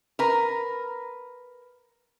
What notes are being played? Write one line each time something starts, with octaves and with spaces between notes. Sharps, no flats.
A#4 B4 A#5